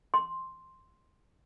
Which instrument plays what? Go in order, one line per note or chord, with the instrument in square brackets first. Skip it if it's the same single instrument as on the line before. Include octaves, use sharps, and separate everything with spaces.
[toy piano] C6